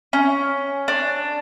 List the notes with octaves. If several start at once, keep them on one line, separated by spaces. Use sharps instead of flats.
C#4
D4